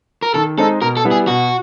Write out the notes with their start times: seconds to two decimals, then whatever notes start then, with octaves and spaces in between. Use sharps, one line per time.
0.23 A#4
0.34 D#3 A4
0.57 G#3 C4 D#4 A4
0.81 B2 A#4
0.97 A4
1.05 G3 B3 E4
1.11 G#4
1.27 B2 F#4